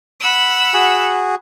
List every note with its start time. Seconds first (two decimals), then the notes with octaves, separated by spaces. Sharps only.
0.20 F#5 B5 E6
0.74 F#4 G#4